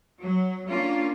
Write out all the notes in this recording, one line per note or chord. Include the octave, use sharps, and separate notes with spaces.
F#3
A#3 C#4 D4 F4